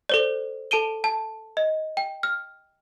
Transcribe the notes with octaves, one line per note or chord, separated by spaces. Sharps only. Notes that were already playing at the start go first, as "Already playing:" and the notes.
A4 C5 D5
A4 A5 D7 D#7 G7
A5
D#5
G5
F6